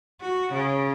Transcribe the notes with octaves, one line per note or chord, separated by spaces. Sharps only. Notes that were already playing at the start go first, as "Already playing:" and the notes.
F#4
C#3